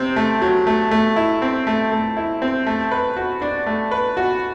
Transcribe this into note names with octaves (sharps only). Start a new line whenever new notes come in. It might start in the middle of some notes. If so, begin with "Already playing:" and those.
Already playing: C3 C4
A3
F#3
A3
A3
E4
C4
A3
A3
E4
C4
A3
B4
F#4
D4
A3
B4
F#4